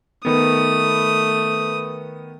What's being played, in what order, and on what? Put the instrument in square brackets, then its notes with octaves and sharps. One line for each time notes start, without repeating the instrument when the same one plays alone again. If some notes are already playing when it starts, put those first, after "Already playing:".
[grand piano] D#3 B3 [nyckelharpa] A3 D#6